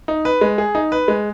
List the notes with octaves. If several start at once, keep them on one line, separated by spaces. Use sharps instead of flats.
D#4
B4
G#3
G#4
D#4
B4
G#3